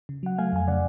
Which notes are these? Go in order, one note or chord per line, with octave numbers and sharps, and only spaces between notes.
C#3
F#3 F#5
A3 F5 G#5
F2 G#5
C#3 D5 F#5